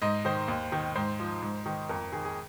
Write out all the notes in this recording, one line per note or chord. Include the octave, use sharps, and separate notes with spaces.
G#2 D#5
D#3 C5
D#2
D#3
G#2 C5
F3
G#2
D#3
F2 A#4
D#3 G#4
G#4